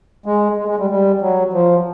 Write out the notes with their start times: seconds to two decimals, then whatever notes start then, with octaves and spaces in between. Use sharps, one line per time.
0.26 G#3
0.57 G#3
0.68 G#3
0.79 G3
0.90 G3
1.21 F#3
1.53 F3